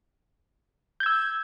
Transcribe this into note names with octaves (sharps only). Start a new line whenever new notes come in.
E6 G6 G#6